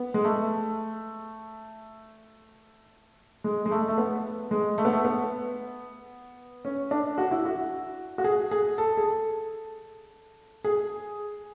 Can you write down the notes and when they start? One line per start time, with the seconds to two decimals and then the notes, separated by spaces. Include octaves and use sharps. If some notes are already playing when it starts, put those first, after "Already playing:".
Already playing: B3
0.14 G#3
0.25 A3
3.44 G#3
3.66 G#3
3.71 A3
3.88 A3
3.98 B3
4.51 G#3
4.78 A3
4.85 B3
4.93 A3
5.05 B3
6.65 C#4
6.91 D4
7.18 F#4
7.31 E4
7.45 F#4
8.18 F#4
8.24 G#4
8.51 G#4
8.78 A4
8.97 G#4
9.04 A4
10.64 G#4